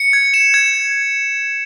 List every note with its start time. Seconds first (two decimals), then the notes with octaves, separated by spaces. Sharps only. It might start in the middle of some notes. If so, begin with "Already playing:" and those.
Already playing: C#7
0.13 G#6
0.34 E7
0.54 G#6